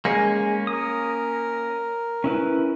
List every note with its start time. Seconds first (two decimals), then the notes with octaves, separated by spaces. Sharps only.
0.05 G#3 A#3 C#4
0.67 A#4 D#6
2.24 C#4 E4 B4